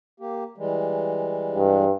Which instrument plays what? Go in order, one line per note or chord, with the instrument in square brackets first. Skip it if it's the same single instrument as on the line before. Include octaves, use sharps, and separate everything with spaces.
[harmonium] A#3 G4
E3 G3 G#3
[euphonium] G2